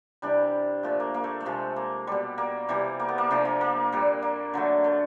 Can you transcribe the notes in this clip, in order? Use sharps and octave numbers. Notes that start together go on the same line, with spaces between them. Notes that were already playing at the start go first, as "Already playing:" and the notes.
C3 E3 G3 D4
A#2 F3 A3
A#3
A#3
A3
A3
C3 F3 G#3
A#3
B2 G3
A#3
C3 E3 G3
A#3
B3
A#3
C3 F3 A3 D4
A#3
A#3
A#2 G3
A#3
D3 F#3 A3
A3